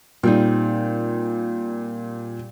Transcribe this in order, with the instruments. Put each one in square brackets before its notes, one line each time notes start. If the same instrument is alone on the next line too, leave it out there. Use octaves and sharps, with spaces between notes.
[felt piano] A#2 [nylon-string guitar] G3 C4 D#4